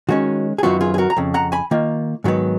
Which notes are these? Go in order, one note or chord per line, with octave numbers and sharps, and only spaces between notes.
D#3 G#3 C#4 F#4
G#4
F#2 D#3 F#3 B3 F4 F#4
F4 G#4
G#4
F#4 A#4
A#5
F2 C#3
F#5 A#5
G#5 B5
D#3 A#3 F4
G#2 D#3 F#3 B3